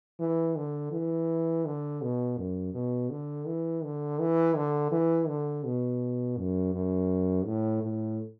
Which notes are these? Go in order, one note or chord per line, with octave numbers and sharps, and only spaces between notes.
E3
D3
E3
D3
B2
F#2
B2
D3
E3
D3
E3
D3
E3
D3
B2
F#2
F#2
A2
A2